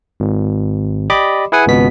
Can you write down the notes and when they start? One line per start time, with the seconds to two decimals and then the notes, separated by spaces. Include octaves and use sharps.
0.20 G#1
1.10 G4 D5 D#5 B5 D6
1.52 E4 G#4 B4 F#5 G#5
1.67 G#1 C#2 B2 B3 B6